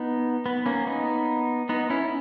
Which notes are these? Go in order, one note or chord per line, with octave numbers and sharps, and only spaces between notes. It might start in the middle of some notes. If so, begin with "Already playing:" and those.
Already playing: B3 D#4
B3
A#3 C#4
B3 D#4
B3 D#4
C#4 E4